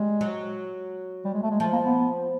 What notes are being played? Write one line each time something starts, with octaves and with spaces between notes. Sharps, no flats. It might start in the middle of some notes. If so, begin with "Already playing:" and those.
Already playing: G3 G#3
F#3
G3
G#3
A3
G#3
F3 A3
A#3
B3